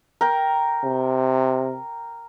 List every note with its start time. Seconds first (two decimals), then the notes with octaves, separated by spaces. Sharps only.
0.21 A#4 G5
0.84 C3